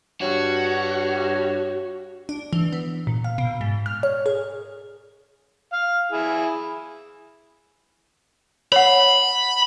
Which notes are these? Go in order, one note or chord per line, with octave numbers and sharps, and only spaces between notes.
G2 F#4 C#5
D4
E3
B3
A#2
F5
B2
G#2
F6
C#5
G#4
F5
E4 G#4
C#5 F#5 B5